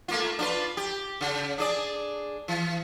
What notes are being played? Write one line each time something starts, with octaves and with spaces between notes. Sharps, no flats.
A3 A#3 F4
D4 F4 B4
G4
C#3
D4 G#4 D5
E3